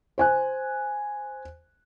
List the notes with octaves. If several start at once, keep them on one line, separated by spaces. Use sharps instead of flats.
C5 G#5 F#6